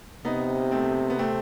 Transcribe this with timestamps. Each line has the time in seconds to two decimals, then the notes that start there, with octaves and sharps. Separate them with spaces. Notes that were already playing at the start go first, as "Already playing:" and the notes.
0.25 C3 B3 D#4
0.71 A3 C4
1.10 B3
1.19 A3 C4